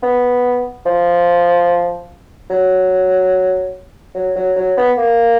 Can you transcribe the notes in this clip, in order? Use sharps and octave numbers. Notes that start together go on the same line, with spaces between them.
B3
F3
F#3
F#3
F#3
F#3
B3
A#3